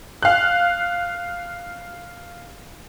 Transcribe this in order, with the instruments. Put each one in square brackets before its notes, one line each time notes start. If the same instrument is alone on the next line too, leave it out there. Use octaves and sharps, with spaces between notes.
[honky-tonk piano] F5 F#6